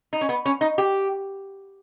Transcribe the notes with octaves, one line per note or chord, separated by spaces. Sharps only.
D#4
C#4
B3
C#4
D#4
G4